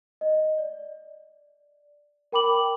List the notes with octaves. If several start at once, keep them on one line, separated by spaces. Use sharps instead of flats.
D#5
D5
A#4 G5 B5 D6 F#7